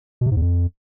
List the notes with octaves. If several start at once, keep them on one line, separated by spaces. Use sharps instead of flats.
B2
C3
G#2
E2
F2